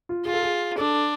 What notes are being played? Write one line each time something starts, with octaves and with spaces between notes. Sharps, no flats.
F4
F4 G#4
A4
G#4
D4 A4